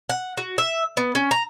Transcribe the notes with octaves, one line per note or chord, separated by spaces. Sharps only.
F#5
F#4
E5
B3
C#4
A#5